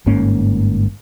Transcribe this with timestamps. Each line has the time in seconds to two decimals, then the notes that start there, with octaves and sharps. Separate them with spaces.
0.06 G1 G#2 A#3 C#4